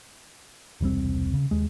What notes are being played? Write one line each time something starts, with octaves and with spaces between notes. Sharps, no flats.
E1 C2 G3 C4
C#3
D#2 G#3